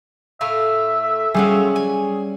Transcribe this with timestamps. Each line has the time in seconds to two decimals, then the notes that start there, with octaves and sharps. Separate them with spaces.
0.41 A2 A3 E5 F5
1.34 G3 A3 C#4 F4 F#4 G#4
1.76 G#5